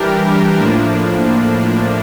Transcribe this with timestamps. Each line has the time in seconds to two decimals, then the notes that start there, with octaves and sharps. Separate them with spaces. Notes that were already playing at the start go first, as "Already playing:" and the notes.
Already playing: E3 G3 D4 G4 A#4
0.57 A2 F3 A#3 D4